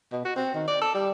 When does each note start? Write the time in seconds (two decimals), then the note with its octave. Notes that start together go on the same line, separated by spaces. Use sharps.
0.12 B2
0.25 F#4
0.36 C4
0.54 D#3
0.67 D5
0.81 A4
0.94 G3